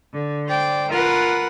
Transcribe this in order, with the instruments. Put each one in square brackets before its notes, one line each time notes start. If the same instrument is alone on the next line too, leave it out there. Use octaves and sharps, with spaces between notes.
[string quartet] D3
C5 D5 G5
F4 A#4 B4 F#5